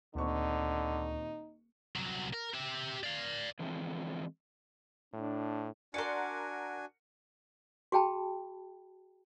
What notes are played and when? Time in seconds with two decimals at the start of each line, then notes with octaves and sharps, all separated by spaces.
0.15 D#1 D2 D3 C4 D#4 C#6
1.96 C2 F#3
2.34 A#4
2.54 G4 E5
3.04 D5 F5
3.59 D3 E3 F3 G#3 A#3 C4
5.14 A2 D4
5.94 D4 F#4 A#4 D5 F#5 G#5 C6 C#7
7.92 F#4 G#4 G5 A5 B5